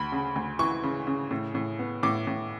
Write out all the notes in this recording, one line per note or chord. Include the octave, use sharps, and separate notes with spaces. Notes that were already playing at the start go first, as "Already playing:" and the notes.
Already playing: D2 B5
C#3
D2
E3 C#6
C#3
C#3
A2
A2
B3
A2 D6
A2